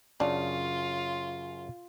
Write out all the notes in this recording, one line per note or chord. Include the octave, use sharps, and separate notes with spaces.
F#2 C#3 D4 F4 A5